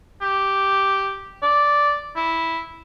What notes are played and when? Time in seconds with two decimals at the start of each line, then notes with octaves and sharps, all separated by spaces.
0.21 G4
1.42 D5
2.16 E4